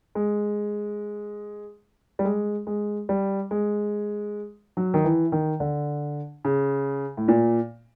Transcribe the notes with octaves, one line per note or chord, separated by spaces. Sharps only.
G#3
G3
G#3
G#3
G3
G#3
F#3
D#3
E3
D#3
D3
C#3
A2
A#2